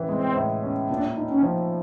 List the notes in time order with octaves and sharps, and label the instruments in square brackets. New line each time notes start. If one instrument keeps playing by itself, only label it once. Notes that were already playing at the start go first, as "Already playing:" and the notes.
Already playing: [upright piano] A2 E3 C#4
[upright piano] G#3 [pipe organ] C4
[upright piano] A2
C#4
[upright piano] A#2 [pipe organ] D4
[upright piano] D#4
[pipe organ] C#4
[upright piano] F3